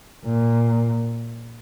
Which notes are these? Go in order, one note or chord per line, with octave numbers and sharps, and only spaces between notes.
A#2